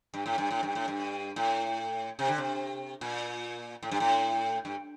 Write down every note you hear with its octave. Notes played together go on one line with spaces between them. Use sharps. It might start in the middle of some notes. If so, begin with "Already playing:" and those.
G2
A2
G2
A2
G2
A2
G2
A2
C3
D3
C3
A#2
A2
G2
A2
G2